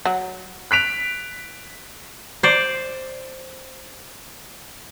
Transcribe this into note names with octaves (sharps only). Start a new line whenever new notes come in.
F#3
F#6 B6 D7 F7
C5 D5